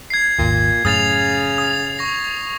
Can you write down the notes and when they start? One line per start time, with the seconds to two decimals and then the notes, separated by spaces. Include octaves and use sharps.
0.10 G#6 C7
0.39 G#1 D#2 A#2
0.85 F#2 A2 C#3 D#6 A6 F7
1.58 D#6
1.99 C#6 A#6